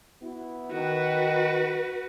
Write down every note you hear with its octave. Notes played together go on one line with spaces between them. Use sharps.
B3 E4 F#4
D#3 F#4 B4